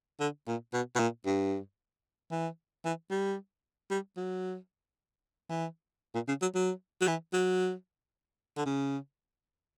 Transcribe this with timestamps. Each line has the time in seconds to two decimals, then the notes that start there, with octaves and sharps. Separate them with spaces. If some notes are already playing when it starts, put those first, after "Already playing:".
0.20 D3
0.47 A#2
0.73 B2
0.95 B2
0.99 A#2
1.26 G2
2.31 E3
2.85 E3
3.10 G3
3.90 G3
4.17 F#3
5.49 E3
6.15 A#2
6.28 C#3
6.42 F#3
6.55 F#3
7.01 F#3
7.07 E3
7.33 F#3
8.57 D3
8.65 C#3